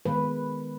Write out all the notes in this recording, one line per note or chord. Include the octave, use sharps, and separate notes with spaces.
D#3 G#3 B3 B4